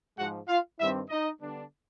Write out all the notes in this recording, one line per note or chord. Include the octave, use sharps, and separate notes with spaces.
G#2 F3 G#3 F#4 F#5
F4 F5
G2 D#3 G3 C4 E4 E5
D#4 D#5
D3 G3 B3 D4